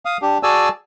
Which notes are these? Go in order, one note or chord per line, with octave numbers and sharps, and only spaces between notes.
F5 D#6
D4 G4
F#4 G#4 D5 G#5 A5 E6